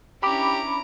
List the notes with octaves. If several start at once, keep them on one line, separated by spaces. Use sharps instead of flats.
C#4 D4 E4 G4 A#5 B5 D6 D7